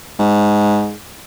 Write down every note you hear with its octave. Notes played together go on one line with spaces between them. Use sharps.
G#2